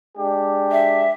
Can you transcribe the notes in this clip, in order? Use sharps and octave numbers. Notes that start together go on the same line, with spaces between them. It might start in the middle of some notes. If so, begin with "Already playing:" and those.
G#3 D4 G4
E5